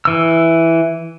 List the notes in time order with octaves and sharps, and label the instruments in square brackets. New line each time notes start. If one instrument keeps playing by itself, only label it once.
[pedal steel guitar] E3 E6